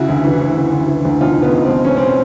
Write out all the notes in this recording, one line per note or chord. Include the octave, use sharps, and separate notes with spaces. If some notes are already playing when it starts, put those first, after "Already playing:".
Already playing: C#3 E4 F#4
D2
E3
D2
C#3
D2
E3
D2
B2 D#4 F4
C#2
B3
C#2
B2 C4
B2 C#4
C4